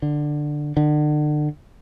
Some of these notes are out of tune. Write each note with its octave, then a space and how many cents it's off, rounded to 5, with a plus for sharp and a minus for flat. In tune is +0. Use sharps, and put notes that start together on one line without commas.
D3 +10
D3 +35